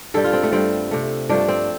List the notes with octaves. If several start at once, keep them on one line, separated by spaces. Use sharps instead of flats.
G2 G3 A4
F4
C4
A3
G2 G3 C4
C3 A3
G2 F3 A3 D4
C4